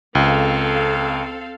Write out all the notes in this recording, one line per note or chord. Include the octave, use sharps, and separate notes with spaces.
C#2 C4 A4 F5